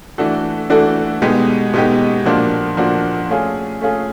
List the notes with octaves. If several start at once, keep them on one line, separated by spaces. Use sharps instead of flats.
E3 A3 D4 F#4 A4
E3 A3 D4 F#4 A4
B2 G#3 B3 D#4 G4
B2 G#3 B3 D#4 G4
A#2 F3 A#3 D4 F#4
A#2 F3 A#3 D4 F#4
A3 C#4 F4 G#4
A3 C#4 F4 G#4